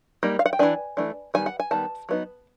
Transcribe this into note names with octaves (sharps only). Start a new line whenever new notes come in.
G3 A#3 D#4
F5
F#5
G5
E3 A3 D4 G#5
E3 A3 D4
D#3 G3 B3 G#5
F#5
G#5
D#3 G3 B3 A5
F#3 B3 D#4